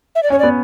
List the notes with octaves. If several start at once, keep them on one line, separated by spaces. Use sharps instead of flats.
E5
D5
C#4 C#5
B3 D5